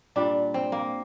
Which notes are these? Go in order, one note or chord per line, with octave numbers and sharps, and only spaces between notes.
A#2 G3 D4
C4
A#3